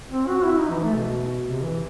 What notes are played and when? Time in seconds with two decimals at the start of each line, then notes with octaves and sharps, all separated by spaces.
0.11 C4
0.28 F#4
0.45 E4
0.58 D#4
0.70 E3
0.83 A3
0.96 B2
1.47 C3
1.64 E3